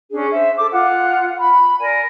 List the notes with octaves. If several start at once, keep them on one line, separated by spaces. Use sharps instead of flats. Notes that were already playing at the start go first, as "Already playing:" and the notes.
C#4 D4 G#4
C5 E5
A4 D6
F4 F#5
B5
A#4 D5 G#5